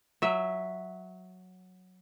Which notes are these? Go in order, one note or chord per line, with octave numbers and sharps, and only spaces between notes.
F#3 E5